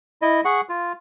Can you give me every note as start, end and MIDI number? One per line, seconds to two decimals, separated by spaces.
0.22 0.41 64
0.22 0.41 75
0.45 0.61 68
0.45 0.61 78
0.45 0.61 85
0.69 0.92 65